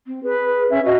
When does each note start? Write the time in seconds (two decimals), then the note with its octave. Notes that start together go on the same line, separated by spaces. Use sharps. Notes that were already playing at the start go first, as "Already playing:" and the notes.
0.07 C4
0.24 G#4 B4
0.70 C#4 E5
0.85 F#4 D#5